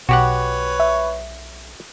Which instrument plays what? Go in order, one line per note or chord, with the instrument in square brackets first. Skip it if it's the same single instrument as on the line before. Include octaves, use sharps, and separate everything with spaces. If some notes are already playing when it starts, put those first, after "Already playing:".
[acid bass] B1 [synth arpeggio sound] B2 [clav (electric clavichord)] F#4 G4 F#5 [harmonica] B4 C#5
[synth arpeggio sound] E5